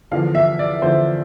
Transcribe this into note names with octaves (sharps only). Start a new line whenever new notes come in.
E2 D3 F3 F5
E5
D5
E2 D3 F3 C5